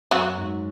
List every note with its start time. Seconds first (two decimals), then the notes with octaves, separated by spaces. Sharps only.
0.11 F#2 F#3 F#4
0.38 G#2